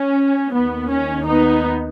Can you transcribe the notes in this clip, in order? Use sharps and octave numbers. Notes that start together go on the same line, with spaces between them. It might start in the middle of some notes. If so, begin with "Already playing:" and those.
Already playing: C#4
D#2 D#3 B3
C#4
B3 D#4